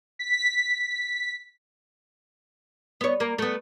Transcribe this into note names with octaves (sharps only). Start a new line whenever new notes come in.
B6
B3 C#5
A#3
A3 B3